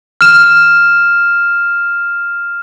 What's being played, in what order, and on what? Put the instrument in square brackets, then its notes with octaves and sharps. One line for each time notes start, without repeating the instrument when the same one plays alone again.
[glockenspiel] F6 E7